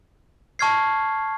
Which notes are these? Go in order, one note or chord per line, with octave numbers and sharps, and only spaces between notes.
A5 C#6 F6 G#6 C7